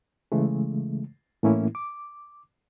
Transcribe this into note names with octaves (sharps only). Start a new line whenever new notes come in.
C#3 E3 G#3 A3
A2 E3 A3 A#3 C#4 E4
D6